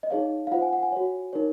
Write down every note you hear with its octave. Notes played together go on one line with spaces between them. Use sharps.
D#5
D#4 G#4 C#5 F5
F5
F4 C5 F#5
G#5
F#5
G#5
F#4 C#5
D#4 A#4 C#5